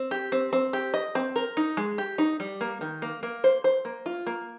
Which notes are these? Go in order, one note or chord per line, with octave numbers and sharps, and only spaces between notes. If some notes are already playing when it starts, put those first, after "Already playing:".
Already playing: C4
G4
C4
C4
G4
D#5
C4
A#4
D#4
G#3
G4
D#4
G3
A#3
D#3
A#3
A#3
C5
C5
A#3
F4
A#3